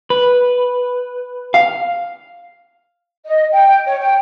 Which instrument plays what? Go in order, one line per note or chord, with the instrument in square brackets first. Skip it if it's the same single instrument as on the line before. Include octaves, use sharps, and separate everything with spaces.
[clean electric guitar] B4
[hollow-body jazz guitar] F5
[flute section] D#5
G5
C#5
G5